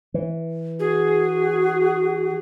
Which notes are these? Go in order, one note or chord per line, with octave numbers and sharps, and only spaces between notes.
E3
F#4 G#4